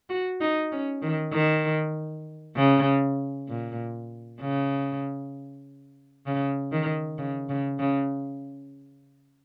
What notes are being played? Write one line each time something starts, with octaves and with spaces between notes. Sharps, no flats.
F#4
D#4
C#4
D#3
D#3
C#3
A#2
C#3
C#3
D#3
C#3
C#3
C#3